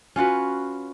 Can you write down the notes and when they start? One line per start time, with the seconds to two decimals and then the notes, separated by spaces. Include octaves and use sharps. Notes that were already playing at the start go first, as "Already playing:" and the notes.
0.16 C#4 F4 F#4 B4